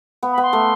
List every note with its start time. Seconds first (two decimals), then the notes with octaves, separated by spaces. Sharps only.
0.23 B3
0.32 B5
0.38 B3 C6
0.53 A3